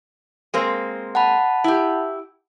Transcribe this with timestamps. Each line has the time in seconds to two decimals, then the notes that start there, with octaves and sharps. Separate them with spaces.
0.54 G#3 A#3 C4
1.15 F#5 A5 B5
1.64 E4 G4